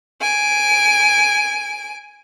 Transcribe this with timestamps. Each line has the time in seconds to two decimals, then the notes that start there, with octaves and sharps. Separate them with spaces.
0.21 G#5 D7